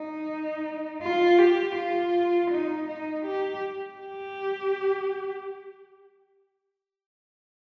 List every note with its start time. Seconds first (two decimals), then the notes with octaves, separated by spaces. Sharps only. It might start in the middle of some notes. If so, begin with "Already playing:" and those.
Already playing: D#4
1.02 F4
1.38 G4
1.76 F4
2.51 D#4
2.87 D#4
3.25 G4
3.99 G4